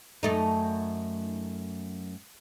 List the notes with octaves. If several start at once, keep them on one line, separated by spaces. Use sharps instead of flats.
F#2 A3 D#4